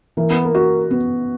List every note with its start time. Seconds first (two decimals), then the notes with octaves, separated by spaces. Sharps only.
0.17 E3 A#3
0.30 B3
0.45 A#3
0.55 F#4
0.91 B3